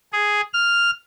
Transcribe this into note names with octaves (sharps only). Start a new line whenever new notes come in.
G#4
F6